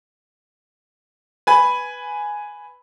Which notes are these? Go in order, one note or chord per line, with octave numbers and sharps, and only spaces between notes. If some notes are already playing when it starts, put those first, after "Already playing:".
B4 G#5 B5